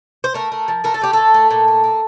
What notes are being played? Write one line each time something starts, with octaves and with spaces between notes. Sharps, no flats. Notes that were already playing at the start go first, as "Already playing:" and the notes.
C5
A3 A#4
A3
F3
A3 A#4
A4
A3 G4
A2 A4
A3
A#2
A3
A#3